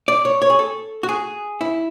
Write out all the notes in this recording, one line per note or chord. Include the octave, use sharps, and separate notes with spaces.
D5
C#5
C#5
G#4
A4
F#4
G#4
E4